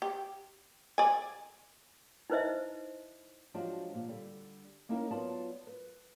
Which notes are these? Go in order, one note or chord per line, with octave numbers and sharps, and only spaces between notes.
G4
D5 G#5
D#4 E4 B4 C5 D#5 E5
F3 F#3 G#3 D4 F#4 G4
A#2
D3 G3
A#3 C#4 D#4 E4 A#4 D#5
F#3 B3 F4 D5 A5
B4